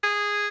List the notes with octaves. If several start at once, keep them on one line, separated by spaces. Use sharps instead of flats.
G#4